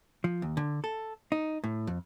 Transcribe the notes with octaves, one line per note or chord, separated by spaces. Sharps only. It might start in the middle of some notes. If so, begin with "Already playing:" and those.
F3
D#2
D3
A4
D#4
A2
F2